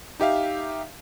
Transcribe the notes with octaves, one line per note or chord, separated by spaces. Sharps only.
D#4 G4 E5 F5